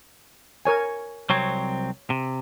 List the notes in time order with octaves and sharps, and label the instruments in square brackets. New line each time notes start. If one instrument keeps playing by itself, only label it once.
[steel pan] A#4 C#5 G#5
[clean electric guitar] C2 F#3 C4 [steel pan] C#5
[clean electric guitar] C3